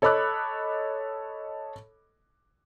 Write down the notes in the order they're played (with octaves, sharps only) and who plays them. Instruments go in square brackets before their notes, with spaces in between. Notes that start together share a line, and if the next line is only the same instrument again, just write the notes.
[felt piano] A4 C#5 D#5 B5 D6 F#6